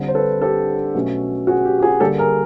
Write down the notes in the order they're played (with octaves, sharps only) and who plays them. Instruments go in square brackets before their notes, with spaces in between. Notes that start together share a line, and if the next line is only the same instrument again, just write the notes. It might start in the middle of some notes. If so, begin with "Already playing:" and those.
Already playing: [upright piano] D3 G3 C4
C5
A4 B4
G4 A4
B2 F#3 A3 C#4
F#4 G#4
G4
G4
F#4 G#4
D3 G3 A#3 G4 A4
G#4 A#4